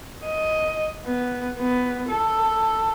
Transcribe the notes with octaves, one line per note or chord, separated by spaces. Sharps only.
D#5
B3
B3
A4